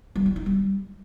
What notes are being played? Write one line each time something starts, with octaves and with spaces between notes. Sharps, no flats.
G3
E4
D#4
G3